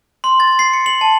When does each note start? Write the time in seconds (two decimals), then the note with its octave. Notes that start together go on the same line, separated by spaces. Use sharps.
0.24 C6
0.40 A6
0.59 C7
0.73 C#7
0.86 F#7
1.01 A5